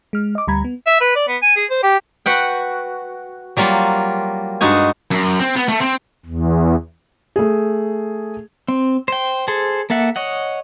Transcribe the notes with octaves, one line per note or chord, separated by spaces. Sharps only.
G#3 F6
D#5 D6
D2 G3 A#5 B5 G#6
B3
E5
B4
D5
B3
G#5
G#4
C5
G4
F#4 B4 F#5 G5
F#3 G3 A#3 F4
G2 G#3 D#4 F#4 G#5
F#2
C4
B3
A3
C4
E2
A3 G#4
C4
C5 G5
G#4 A4 C5
A#3 A4 E5 F#5
C#5 D#5 F#5